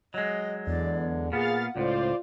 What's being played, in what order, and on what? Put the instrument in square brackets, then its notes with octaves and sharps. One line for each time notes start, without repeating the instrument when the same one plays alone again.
[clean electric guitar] F#3 G#3 [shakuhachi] D#5
[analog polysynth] E2 [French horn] D3 [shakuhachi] D5
[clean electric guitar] A#2 B3 [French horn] G#4 [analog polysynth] F5 F6 A6 [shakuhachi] F#5
[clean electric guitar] C#2 A2 [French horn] F4 [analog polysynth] C5 D5